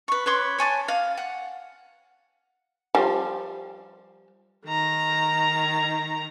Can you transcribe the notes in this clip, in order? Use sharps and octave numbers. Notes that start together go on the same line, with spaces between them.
B4 C#6
B4 C#5 C6 D6
C#5 G#5 A5 D6
F5
F#5
F3 G3
D#3 A#5